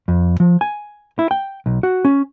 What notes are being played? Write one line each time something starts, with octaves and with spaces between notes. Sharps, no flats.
F2
F3
G#5
E4
G5
B1
F#4
C#4